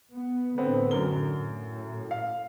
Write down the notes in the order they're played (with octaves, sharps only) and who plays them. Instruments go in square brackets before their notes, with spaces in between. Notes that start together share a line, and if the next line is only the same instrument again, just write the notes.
[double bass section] B3
[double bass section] A2 D3 [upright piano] B3 C4
[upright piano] F#2 A#4 G7
[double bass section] A2
[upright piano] F5